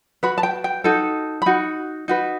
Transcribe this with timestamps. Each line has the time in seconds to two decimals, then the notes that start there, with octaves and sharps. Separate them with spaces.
0.23 F#4 B4 B5
0.38 A5
0.43 G5
0.64 G5
0.84 D#4 F#4 A4
1.42 B5
1.46 D#4 F#4
2.08 D#4 F#4 B4